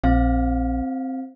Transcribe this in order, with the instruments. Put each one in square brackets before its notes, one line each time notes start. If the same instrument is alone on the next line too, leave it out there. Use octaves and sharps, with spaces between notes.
[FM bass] A#1 [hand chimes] C4 F5